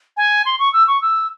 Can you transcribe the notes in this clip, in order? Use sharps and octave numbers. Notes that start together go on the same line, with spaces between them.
G#5
C6
C#6
E6
C#6
E6